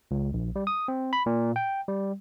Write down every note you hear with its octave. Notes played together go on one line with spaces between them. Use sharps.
C#2
A#1
G3
D#6
C4
B5
A#2
G5
G3